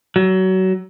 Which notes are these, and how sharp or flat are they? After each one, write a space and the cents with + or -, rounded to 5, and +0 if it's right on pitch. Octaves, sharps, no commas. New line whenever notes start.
F#3 +25